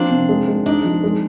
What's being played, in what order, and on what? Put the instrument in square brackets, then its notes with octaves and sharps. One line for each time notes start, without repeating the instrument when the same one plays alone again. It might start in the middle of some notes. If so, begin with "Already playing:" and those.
Already playing: [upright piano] F3 [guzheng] A#3 C4 D4
[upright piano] C3
G#3
G#3
[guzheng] D4 [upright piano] D#4
[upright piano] F3
G#3